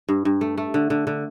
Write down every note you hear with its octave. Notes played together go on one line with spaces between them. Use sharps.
G2
G2
A3
A3
D3
D3
D3